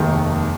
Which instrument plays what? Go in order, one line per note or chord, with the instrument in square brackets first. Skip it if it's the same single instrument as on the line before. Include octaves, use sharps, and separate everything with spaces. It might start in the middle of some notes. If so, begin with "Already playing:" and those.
Already playing: [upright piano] F1 D#2 D#3 G#3